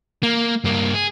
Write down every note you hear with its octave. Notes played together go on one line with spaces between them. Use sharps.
A#3
G2 A#3
G#4